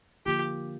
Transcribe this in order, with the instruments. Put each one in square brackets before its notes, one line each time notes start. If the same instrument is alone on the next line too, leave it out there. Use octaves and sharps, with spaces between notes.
[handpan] D3 F3 A#3 F4 [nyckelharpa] G4